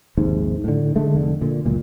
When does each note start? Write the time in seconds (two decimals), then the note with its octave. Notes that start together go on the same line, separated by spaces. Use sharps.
0.17 A#1 D#2 G#2 C3
0.64 A2 D3
0.96 D3 G#3 A3
1.15 F1 D3
1.41 A#2 D3
1.66 C#2 F#2 A#2